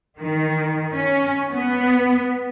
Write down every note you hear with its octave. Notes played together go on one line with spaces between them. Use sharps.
D#3
C#4
B3